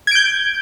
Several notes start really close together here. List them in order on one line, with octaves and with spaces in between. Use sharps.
G#6 D7 G6